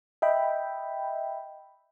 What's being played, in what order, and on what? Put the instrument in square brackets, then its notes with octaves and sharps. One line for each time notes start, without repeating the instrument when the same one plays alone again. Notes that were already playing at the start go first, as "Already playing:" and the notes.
[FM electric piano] D#5 E5 G5 B5